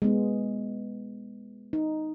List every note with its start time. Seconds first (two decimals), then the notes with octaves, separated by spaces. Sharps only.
0.02 G#3 B3
1.73 D#4